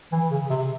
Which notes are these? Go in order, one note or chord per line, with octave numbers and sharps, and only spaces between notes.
E3
C#3
C3